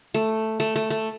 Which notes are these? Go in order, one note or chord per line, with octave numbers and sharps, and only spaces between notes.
A3
A3
A3
A3